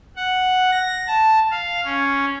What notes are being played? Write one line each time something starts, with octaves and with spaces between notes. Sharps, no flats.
F#5
A#6
A5
F5
C#4